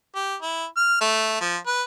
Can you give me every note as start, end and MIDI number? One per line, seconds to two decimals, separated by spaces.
0.15 0.35 67
0.42 0.65 64
0.77 0.97 89
1.01 1.36 57
1.41 1.57 53
1.66 1.83 71